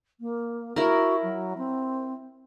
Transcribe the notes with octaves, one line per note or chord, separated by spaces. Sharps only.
A#3
E4 F#4 A#4
F#3
C4